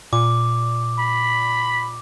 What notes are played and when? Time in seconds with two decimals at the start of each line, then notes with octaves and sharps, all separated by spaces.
0.13 A#2 D6
0.99 B5